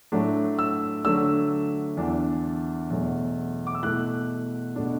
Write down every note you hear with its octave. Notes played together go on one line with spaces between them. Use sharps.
A2 F#3 A3 D4
E6
D3 F#3 A3 D4 E6
E2 E3 D4
E2 B2 F#3 A3
D6
E6
B2 A3 E4 F#6
B2 A3 D4